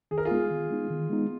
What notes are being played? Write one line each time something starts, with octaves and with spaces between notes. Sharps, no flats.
D#3 G#4
A#4
F4 G#4
G#3 B3 D#4
D#3
G#3 B3 D#4
D#3
G#3 B3 D#4